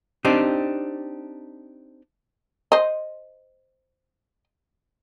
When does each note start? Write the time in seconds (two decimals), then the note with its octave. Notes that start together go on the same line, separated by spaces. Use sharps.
0.25 C4 D4 D#4 G4
2.72 C5 D#5